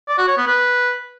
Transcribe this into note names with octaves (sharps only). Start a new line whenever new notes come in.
D5
F#4
C#5
B3
B4